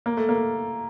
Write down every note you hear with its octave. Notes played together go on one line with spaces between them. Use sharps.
A#3
A3
A#3